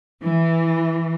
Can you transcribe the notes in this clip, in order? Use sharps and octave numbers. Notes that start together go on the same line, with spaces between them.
E3